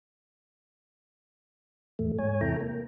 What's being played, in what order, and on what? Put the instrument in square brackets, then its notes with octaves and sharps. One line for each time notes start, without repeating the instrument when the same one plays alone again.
[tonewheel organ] E2 A2 A3
G#2 C#5 G#5
E2 C3 E4 A4 G5 A#5
A#3